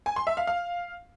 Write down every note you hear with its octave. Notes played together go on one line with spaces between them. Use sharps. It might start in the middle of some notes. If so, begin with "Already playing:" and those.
G#5
C6
E5
F5
F5